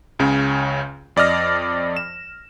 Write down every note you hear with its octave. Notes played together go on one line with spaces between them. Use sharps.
C#2 C#3 C#4
F2 D5 D#5 F6 A#6
E7